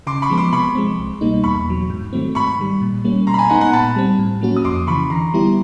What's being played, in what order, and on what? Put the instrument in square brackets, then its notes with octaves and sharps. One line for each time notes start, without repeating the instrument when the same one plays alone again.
[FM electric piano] C#3 [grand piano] C6 D6
[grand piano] B5 C#6
[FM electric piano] F3 G#3 B3
[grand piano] C6 D6
[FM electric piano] C3 [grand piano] B5 C#6
[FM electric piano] F3 G#3 C4
C2
B2 G3 A#3 D#4
[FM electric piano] E2 [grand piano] B5 C#6
[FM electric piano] B2 F#3
G#2
D#3 F#3 A3 C4
[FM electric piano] G#2 [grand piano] B5 C#6
[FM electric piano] D#3 G3
A#2
G3 A#3 C#4
[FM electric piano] B2 [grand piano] A#5 C6
[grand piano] B5
G#5 A#5
[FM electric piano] G#3 B3 D#4 [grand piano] F#5 G#5
[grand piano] F#5 G#5
[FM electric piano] A#2 [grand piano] A5 B5
[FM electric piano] G3 C4
A2
F#3 A#3 C#4 F#4
[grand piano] D#6
[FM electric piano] F2 [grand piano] C6 D6
[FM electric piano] C#3 E3 [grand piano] B5 C#6
[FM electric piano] D3 [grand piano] A#5 C6
[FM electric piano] G3 B3 E4 G4